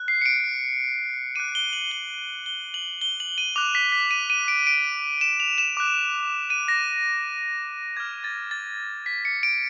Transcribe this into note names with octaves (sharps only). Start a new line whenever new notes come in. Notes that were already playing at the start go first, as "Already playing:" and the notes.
Already playing: F#6
C7
C#7
D7
D6 F#6 D#7
G7
F#7
G7
G7
F#7
G7
F#7
D#7
D6 F#6 F7
B6
B6
D#7
D#7
D7
D7
E7
F7
E7
D6 F#6
D#7
A#6
D6 F6 G#6
A6
A6
B6
C#7
D7